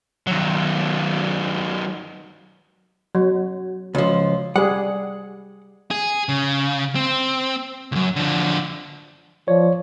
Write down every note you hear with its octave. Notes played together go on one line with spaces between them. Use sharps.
D#3 F#3
F#3
C#2 F3
G3 G#4 F#5
G#4
C#3
C4
C#2 F#2
D3 F3
F3 C#5 D5